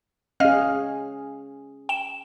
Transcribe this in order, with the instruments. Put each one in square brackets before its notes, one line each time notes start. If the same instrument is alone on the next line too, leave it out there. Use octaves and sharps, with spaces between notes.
[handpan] C#4 G#4 [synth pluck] D#5 F5 F6
[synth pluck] G5 E7